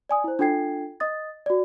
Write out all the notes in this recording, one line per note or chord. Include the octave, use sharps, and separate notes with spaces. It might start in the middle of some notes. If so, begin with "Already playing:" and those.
D5 G#5 D#6
E4 C5
D4 F4 A4 G5 G#6 C7
D#5 D#6 A6
F#4 D5